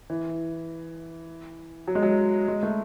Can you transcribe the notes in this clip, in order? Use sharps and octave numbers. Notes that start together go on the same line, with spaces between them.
E3
F#3
G#3
F#3
G#3
A3